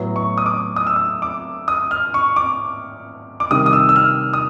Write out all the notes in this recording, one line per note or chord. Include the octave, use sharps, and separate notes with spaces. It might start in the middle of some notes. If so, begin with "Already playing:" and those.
Already playing: A2 F#3 B3 E4
C#6
D#6
D6
D#6
E6
D#6
D6
D#6
F6
C#6
D6
D6
C3 D#3 G3 D#6
D#6
E6
E6
F6
D#6